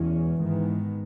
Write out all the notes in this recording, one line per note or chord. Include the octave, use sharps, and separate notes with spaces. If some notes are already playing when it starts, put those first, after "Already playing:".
Already playing: E2 B2 E3 G#3 C#4
G#2 D#3 G#3 B3